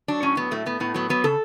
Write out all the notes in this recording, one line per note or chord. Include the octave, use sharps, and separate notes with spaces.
F#3 D4
A2 C#4
F#3 B3
A2 A3
A3 B3
A2 B3
F#3 B3
F#3 B3
C#3 A4